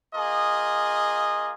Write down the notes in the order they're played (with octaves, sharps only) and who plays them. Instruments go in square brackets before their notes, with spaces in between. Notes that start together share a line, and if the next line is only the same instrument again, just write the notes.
[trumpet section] A#3 F4 G#4 D#5